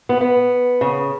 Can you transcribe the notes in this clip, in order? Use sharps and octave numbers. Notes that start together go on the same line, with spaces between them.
B3
B3
C#3